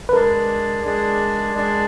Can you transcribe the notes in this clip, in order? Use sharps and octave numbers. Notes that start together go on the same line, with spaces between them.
B4
G#3 D4 G#4 A#4 D5
G#3 D4 G#4 D5
G#3 D4 G#4 D5